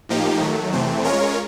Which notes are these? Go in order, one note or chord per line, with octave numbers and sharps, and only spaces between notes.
A2 F3 A#3 D#4 G4
D#3 F#3 A3
E2 C3 E3 A3 C4
G#3 C#4 F4 A#4 C#5